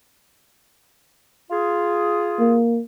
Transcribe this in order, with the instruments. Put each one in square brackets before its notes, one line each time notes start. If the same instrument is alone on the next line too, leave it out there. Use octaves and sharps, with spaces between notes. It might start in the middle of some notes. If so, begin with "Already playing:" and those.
[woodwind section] F4 G#4
[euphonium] A#3